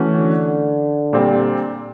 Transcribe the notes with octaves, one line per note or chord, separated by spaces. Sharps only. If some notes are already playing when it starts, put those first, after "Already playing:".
Already playing: E3 A3 C#4 F#4
D3
A#2 G3 C4